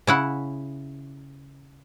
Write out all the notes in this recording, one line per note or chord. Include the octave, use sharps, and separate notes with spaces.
C#3 E4 F#5